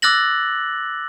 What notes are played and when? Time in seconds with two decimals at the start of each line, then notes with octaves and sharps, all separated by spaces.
0.02 D6 E6 F#6 A6 A#6 F#7